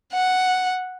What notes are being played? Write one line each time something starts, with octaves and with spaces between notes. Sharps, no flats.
F#5